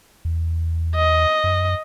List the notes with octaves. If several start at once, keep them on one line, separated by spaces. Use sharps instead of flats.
E2
D#5
F#2